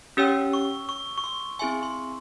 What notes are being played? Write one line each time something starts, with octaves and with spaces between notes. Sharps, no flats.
C#4 G4 C#5 G5 E6
C#6
C#6
C#6
C6
C4 E4 G#4 E5 G#5 C6
C6